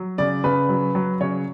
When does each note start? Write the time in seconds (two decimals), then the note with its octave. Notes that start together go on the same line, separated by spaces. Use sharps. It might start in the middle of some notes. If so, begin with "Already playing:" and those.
Already playing: F#3
0.18 C#3 D5
0.44 C#3 B4
0.69 F#3
0.95 F#3
1.21 C#3 C#5